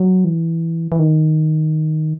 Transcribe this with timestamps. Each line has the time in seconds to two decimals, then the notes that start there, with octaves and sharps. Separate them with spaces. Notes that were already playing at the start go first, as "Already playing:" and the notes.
Already playing: F#3
0.25 E3
0.92 E3
0.99 D#3